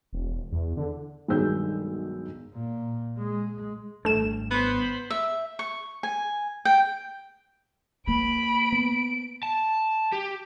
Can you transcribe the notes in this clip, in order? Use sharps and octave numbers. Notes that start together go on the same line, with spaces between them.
E1
E2
D3
B1 G2 D#3 G#3 E6 G6
A#2
G#3
G#1 G3 A3 D4 E7
B3 C5 B5
E5
C#6
G#5
G5
A#3 B5 D7
B3
A5
G4